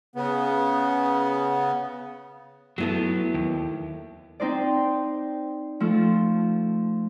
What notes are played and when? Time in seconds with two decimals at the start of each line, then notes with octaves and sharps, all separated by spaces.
0.16 C#3 B3
2.78 F#3 A3 B3 E4 A4
3.34 D#2
4.40 C4 D#4 C5 D5
5.80 F3 A3 A4